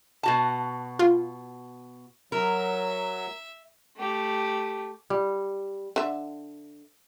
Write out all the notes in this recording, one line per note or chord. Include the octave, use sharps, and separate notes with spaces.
B2 F#4 A5
F4
F#3 A#4 E5
A3 G4
G3
D3 E5